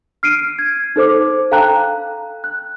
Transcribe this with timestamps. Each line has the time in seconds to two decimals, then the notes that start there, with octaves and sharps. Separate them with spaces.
0.23 F6 C7 D7 D#7
0.59 G#6
0.96 D#4 A4 C5 D6
1.51 A4 F5 G5 A5 A#5 F#6
2.44 F#6